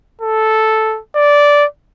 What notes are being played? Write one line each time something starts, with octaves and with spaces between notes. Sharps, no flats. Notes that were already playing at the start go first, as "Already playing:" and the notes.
A4
D5